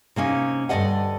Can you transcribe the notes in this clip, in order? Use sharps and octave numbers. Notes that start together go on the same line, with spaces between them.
C3 A#3 C#4 D#4
D2 G2 G3 D5 D#5 F#5